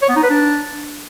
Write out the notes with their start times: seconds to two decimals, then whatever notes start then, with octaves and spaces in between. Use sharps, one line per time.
0.02 C#5
0.09 B3
0.16 D#4
0.23 B4
0.30 D4